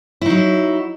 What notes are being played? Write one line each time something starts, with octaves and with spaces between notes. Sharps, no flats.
F#3 D#4 E4